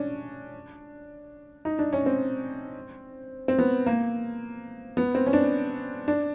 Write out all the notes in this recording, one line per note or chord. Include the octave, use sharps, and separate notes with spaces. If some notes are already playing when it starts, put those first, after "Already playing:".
Already playing: C#4 D4
D#4
D4
C#4
C4
C4
B3
A#3
B3
C4
C#4
D4
D4